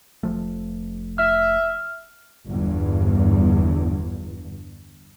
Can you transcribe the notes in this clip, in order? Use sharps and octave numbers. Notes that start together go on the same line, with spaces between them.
F1 F3 A3
E5 F6
G1 E2 G2